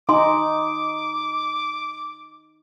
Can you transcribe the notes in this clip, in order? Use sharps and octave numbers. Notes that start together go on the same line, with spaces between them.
D#4 G#5 C6 D6